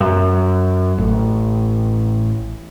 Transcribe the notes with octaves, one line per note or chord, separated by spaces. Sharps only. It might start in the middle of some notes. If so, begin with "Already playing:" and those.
F#2
A1